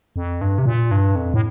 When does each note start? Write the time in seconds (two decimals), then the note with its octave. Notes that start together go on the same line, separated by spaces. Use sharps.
0.16 F2
0.41 G2
0.58 C3
0.66 A#2
0.91 G2
1.16 F2
1.34 A2